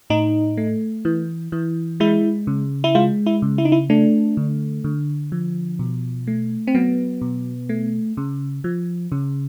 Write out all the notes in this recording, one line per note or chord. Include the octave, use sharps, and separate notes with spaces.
A2 D#4
A3
E3
E3
G#3 E4
C#3
E4
G#3 F4
E4
C#3
E4
D#4
E4
A3 D4
D3
D3
F3
B2
A3
C4
F#3 B3
B2
A3
C#3
F3
C#3